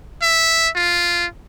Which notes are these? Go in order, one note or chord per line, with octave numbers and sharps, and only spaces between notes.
E5
F4